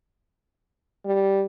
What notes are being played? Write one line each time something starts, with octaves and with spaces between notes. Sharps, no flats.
G3